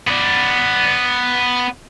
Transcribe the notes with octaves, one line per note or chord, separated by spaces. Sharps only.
B3 D5